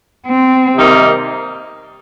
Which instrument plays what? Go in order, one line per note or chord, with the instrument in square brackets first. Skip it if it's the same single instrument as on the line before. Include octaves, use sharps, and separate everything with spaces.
[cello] C4
[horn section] C3 D#3 G3 A#3 D#4